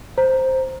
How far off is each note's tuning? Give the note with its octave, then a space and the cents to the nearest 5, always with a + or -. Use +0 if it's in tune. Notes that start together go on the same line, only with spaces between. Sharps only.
C5 +0 A#5 +0